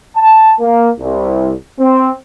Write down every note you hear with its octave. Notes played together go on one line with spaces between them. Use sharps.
A5
A#3
C2
C4